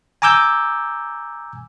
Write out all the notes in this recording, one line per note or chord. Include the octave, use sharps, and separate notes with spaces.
G#5 A#5 D6 E6 G6